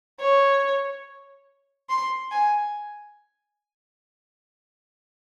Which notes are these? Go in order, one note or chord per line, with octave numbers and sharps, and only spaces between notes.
C#5
C6
G#5